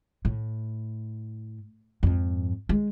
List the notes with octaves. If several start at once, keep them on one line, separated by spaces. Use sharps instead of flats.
A2
F2 G#2
G#3